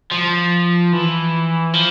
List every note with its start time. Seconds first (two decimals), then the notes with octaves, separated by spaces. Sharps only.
0.12 F3
0.93 E3
1.73 F3